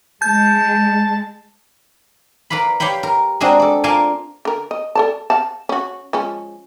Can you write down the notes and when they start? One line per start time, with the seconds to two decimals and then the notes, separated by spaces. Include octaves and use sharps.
0.22 G#3 A5 G6
2.50 A#4 B4 D5 F5 B5
2.80 G4 C#5 F5 G5 B5
3.03 A#4
3.40 G#3 C4 D4 F#4 G#4 A#4
3.60 A4 D5
3.84 F4 A#4 D5 F5 G#5 A5
4.45 D3 A#4
4.71 D#5
4.95 A4 D5 A5
5.30 F5 F#5 A5
5.69 C#4 F#4
6.13 F3 G#3 C#4